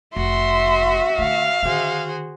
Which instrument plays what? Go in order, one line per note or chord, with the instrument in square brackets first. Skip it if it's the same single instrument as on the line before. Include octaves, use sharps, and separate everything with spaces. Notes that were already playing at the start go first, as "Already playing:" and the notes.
[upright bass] F1 [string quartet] F#4 [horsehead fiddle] E5 [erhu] C6
[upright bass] D3 A3 [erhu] F5
[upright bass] D3 D#3 [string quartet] F#4 G#4 C5